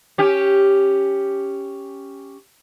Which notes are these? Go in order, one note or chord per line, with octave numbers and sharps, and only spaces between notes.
C#4 G4